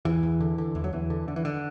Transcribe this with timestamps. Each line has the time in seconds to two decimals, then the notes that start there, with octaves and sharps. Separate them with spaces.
0.05 E2 E3
0.23 E2
0.41 D3
0.58 D3
0.75 E2 E3
0.84 F#3
0.93 E2 E3
1.10 D3
1.28 D3
1.36 E3
1.45 D3